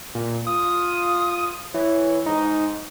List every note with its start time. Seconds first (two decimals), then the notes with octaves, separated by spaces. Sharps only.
0.15 A#2
0.47 F4 D#6
1.74 E3 C#5
2.26 G#2 D#4